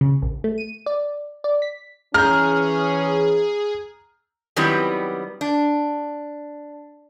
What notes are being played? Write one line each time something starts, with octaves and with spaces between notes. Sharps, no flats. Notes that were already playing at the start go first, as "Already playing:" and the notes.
C#3
A#1
A3
D#7
D5
D5
B6
E3 C#4 G#4 A#5 F6 G6
D#3 F#3 G3 B3 C4 E4
D4